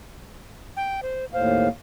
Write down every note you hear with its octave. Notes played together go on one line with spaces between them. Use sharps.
G5
C5
D#2 A2 C5 F5